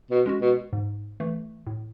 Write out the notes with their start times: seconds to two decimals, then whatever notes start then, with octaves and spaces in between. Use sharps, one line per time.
0.10 B2
0.26 G#3 C#4 F#4
0.41 B2
0.73 G#2
1.20 E3 A3
1.67 A2